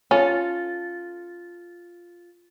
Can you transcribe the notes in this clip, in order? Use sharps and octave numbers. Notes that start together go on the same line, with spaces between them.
C#4 F4 A4